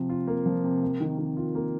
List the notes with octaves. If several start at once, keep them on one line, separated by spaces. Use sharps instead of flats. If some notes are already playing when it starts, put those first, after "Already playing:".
Already playing: C3 F3
F4
A#3
F3
C3
A#3
D#3
D#3
F4
A#3